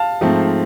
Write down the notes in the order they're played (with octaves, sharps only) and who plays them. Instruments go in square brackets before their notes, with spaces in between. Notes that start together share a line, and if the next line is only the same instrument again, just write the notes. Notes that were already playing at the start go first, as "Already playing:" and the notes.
Already playing: [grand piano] F5 A5
G#2 F3 A3 C4